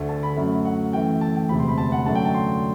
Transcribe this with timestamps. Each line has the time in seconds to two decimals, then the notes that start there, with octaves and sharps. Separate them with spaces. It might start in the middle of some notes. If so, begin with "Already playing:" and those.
Already playing: D2 D3 A3
0.09 A5
0.23 B5
0.36 F#2 F#3 A3
0.65 F#5
0.93 F#2 E3 A3 G5
1.21 A5
1.36 G5
1.49 E1 D2 C3 B5
1.59 C6
1.68 B5
1.78 A5
1.92 F#5
2.06 F#2 D3 F#3 A3 A5
2.15 G5
2.25 A5
2.34 C6